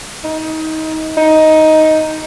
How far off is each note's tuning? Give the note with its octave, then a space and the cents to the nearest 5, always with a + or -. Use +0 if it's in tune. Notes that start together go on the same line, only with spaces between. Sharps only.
D#4 +25
D#4 +10